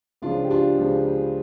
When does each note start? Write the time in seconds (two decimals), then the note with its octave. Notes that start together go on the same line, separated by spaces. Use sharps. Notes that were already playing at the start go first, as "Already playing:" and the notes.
0.22 C#2 C#3 F3 D4 F4
0.44 G4
0.50 D4 F4
0.78 C#2 C#3 F3